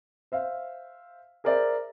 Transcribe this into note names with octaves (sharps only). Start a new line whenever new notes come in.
C5 E5 F5
G#4 A#4 C5 D5 E5